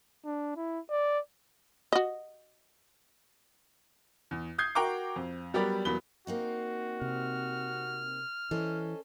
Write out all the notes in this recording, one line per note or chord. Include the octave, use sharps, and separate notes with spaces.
D4
E4
D5
F#4 D#5
E2
D#6 G6 G#6 C7
F#4 A#4 G5 A#5 C#6 D6
F2
F#3 G3 B3 G4 A#4 D5
E2 F#3 A#3 B3 B5 G7
A#3 C4 D#4 F#4
C3 F6
E3 C#4 A4 C5 D#5